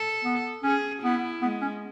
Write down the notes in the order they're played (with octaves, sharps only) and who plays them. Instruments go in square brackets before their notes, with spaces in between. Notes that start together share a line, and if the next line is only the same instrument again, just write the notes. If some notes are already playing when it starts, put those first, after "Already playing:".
Already playing: [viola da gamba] A4
[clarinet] B3
[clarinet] C#4 [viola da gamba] G#4
[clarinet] B3 [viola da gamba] E4
[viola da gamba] G#3 [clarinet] B3
[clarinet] C#4